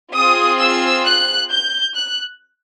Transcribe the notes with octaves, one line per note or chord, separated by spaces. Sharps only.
C4 F4 G#4 D#6
E6
F#6
G6
F#6